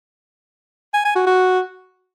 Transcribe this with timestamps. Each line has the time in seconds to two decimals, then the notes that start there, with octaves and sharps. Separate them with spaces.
0.94 G#5
1.05 G#5
1.16 F#4
1.27 F#4